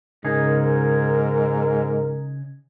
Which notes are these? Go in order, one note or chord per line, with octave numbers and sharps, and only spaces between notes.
G#2 C#3 D#4 G#4 A#4